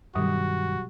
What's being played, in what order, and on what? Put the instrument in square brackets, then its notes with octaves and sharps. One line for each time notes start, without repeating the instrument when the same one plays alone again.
[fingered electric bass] G2 D#3 [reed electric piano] B2 F#3 G4 [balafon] G3 [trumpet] F#4